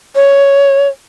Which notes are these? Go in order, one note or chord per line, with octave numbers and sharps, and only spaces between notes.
C#5